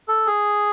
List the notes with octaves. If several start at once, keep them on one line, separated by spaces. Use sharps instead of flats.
A4
G#4